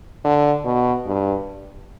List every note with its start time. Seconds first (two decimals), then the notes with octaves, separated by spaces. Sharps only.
0.24 D3
0.65 B2
1.07 G2